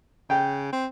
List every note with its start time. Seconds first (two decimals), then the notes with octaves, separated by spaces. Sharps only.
0.30 C#3 G5
0.73 C4